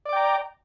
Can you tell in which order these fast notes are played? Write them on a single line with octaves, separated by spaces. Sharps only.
D5 D6 G5 A#5